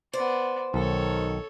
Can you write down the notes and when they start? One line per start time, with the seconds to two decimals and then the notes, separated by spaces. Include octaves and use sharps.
0.13 B3 C5 D5
0.74 B1 D#3 A4 C#5